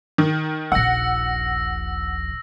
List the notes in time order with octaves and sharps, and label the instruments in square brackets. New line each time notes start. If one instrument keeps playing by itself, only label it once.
[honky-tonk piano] D#3
[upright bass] D#1 A#1 [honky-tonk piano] F#5 [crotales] E6 A#6